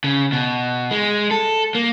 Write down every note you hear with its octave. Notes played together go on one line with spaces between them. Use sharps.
C#3
B2
G#3
A4
A#3